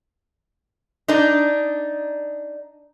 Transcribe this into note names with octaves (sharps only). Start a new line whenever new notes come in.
D4 D#4